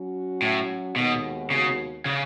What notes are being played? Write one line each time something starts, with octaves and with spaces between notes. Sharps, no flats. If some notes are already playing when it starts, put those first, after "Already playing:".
Already playing: F#3 C#4 F#4
A2
D#2 B2 D#3 G#3 B3 F#4
C#3
C#3